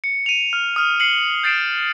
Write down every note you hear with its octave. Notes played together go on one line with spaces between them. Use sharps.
C#7
D#7 F7
F6
D#6 F6
C7 C#7 F#7
G6 A6 C7 D7 E7